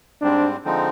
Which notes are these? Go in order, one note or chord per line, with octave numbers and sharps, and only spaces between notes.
G#2 G3 C4 D4
D3 F3 G#3 C4 D#4